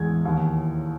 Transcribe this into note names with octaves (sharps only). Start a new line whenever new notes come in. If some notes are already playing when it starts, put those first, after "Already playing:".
Already playing: E2 A2 G#3 G#6
D#2